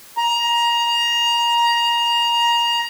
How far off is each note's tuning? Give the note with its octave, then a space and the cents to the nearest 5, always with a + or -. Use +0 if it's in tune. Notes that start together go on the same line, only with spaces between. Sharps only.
A#5 +20